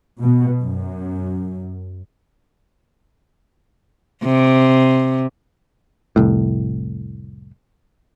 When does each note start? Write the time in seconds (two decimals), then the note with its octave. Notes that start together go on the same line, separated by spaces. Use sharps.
0.20 B2
0.61 F#2
4.24 C3
6.16 F1 C2 A2